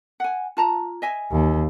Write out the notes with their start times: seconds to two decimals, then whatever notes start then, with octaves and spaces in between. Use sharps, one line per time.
0.20 F#5 G#5
0.57 F4 A5 A#5
1.02 D#5 E5 G#5
1.31 D#2